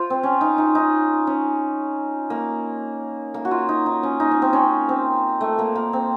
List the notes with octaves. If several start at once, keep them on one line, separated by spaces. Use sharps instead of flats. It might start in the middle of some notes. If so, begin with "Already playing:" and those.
Already playing: F4 C5
C4
C#4
D#4
D#4
D#4
C#4
A#3
A#3
F#4
F4
D#4
D#4
C#4
D#4
C#4
C4
C#4
C4
A3
A#3
A#3
C4